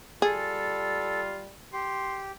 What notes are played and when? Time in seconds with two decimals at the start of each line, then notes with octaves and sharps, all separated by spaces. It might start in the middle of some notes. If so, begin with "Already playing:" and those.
0.22 G3 F4 G#4 A4
1.73 G4 C6